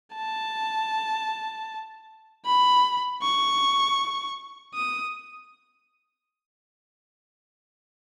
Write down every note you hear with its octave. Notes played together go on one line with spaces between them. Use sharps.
A5
B5
C#6
D#6